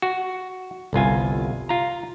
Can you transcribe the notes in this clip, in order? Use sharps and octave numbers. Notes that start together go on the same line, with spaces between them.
F#4
G1 C2 F4 G#5
F4 A#5